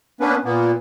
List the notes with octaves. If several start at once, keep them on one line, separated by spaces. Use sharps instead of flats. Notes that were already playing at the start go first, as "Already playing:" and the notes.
A#3 B3 C#4 D4 B4
A#2 A#3 B3